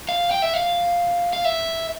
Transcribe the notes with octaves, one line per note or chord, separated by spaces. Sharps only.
F5
G5
E5
F5
F5
E5